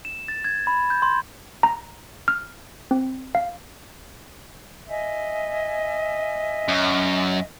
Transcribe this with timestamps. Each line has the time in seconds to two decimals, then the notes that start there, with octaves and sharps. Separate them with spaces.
0.05 E7
0.28 A6
0.44 G#6
0.67 B5
0.90 G6
1.02 C6
1.63 A#5
2.28 F6
2.91 C4
3.35 F5
4.88 D#5 E5 G#5
6.68 F#2